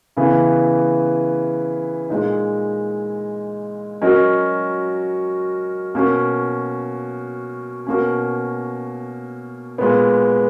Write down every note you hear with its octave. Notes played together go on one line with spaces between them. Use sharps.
C#3 E3 B3
A#2 G#3 D#4
F#3 C#4 F#4 A#4 D#5
B2 A#3 C#4
B2 A#3 C#4
A#2 G#3 B3